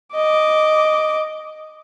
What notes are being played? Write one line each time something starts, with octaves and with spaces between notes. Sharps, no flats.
D#5 D6